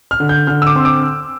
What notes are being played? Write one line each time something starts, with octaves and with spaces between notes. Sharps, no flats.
F6
D3
G6
D3 F6
E6
D6
C4 C6
D6